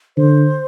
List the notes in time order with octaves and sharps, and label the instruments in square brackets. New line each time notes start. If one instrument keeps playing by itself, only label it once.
[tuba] D3 [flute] C5